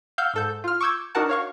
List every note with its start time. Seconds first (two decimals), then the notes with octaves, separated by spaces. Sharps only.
0.18 F5 F#5 E6 F6 G6
0.34 G#2 A4 G6
0.64 F4 F6
0.81 C#6 D6 E6 G6 G#6
1.15 D4 D#4 F#4 A#4 F#5 A5
1.29 C#5 F5 C#6